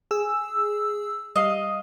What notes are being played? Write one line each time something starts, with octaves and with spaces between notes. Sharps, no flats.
G#4 E6
G3 D#5 F5